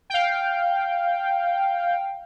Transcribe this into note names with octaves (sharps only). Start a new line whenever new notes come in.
F5 G5